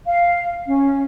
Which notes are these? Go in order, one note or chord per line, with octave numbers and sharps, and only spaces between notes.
F5
C#4